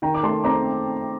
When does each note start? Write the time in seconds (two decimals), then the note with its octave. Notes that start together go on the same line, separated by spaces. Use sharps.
0.02 D#3 G5 A#5
0.15 D6
0.23 A3 A5 C6
0.44 C4 A#5 D6